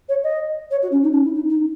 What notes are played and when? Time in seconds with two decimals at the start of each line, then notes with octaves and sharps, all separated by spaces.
0.09 C#5
0.23 D#5
0.70 C#5
0.82 F#4
0.91 C#4
1.03 D#4
1.12 C#4
1.24 E4
1.34 D#4
1.49 D#4